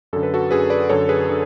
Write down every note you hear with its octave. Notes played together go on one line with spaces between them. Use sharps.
F#2 D3 A4
B4
F#4 A4
F#2 D3 G#4 B4
B4 D5
F#2 D3 A4 C#5
G#4 B4
D3